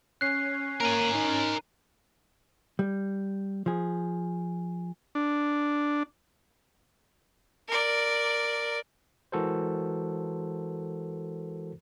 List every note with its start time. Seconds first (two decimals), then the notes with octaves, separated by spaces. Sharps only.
0.21 C#4 F#6 C7
0.81 A#3 A#4 G#5 A#5
1.14 D#4
2.79 G3
3.66 F3 G#4
5.15 D4
7.68 A#4 D5
9.32 E3 G#3 F#4 A4 A#4 C5